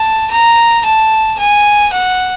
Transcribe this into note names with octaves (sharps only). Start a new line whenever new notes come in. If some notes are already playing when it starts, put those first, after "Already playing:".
Already playing: A5
A#5
A5
G#5
F#5